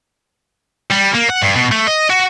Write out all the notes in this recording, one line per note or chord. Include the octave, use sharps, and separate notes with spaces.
G3
A#3
F#5
G2
B2
A3
D#5
F#4